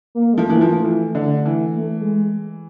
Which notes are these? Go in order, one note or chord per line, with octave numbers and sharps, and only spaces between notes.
A#3
G#3
F3 A3
E3 A#3
F3 A3
E3
D3
E3
A3
G#3